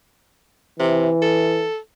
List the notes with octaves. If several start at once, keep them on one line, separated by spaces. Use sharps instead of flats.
C3 E3
A4